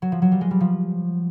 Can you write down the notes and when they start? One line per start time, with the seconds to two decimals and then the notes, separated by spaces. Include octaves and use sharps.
0.02 F#3
0.12 F3
0.22 F#3
0.32 G3
0.41 G#3
0.51 G3
0.60 F3